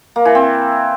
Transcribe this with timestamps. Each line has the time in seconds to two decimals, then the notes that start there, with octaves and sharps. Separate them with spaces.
0.16 A#3
0.25 E3
0.35 C4